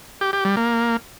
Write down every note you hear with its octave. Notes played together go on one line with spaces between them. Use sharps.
G4
G4
G3
A#3